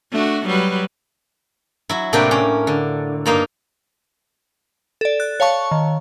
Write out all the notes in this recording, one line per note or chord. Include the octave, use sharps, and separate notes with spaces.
A3 D4 F#4
F#3 G3 B4
F#3 E4
A2 C3 A#3 D4 B4 G5
C#4
D3
G2 A#3 D#4
A4 D5
F#6 A6
C#5 F5 A5 C#6
D#3